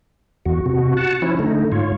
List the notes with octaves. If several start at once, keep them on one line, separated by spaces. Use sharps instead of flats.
E2 F#4
C3 F#4
F#4 F#5 A5
F3 C#4 E4
D3 A3 D#4
G#2 F4 C#5